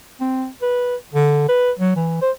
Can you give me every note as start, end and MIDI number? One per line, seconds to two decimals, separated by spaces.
0.21 0.47 60
0.62 0.96 71
1.14 1.44 50
1.49 1.72 71
1.79 1.94 54
1.96 2.18 52
2.22 2.31 72